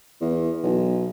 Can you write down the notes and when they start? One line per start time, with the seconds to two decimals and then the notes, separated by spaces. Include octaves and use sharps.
0.21 E2
0.63 B1